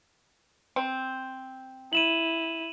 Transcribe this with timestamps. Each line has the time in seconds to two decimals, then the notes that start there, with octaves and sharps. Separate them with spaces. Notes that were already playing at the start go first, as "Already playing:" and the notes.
0.76 C4
1.93 E4 D#7 E7 F#7